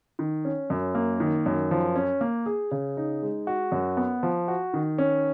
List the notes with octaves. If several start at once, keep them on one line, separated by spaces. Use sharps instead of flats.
D#3
C#4
F#2
A#3
D#3
F#2
F3
C#4
A#3
G#4
C#3
D#4
G#3
F#4
F#2
B3
F3
F#4
D#3
C#4